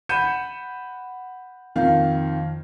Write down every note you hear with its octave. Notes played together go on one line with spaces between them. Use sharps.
F#5 B5 G6 C#7 D#7 E7
F2 A#2 D#3 F5